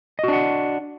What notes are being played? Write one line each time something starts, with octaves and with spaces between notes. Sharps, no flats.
D4 F#4 D#5 F#5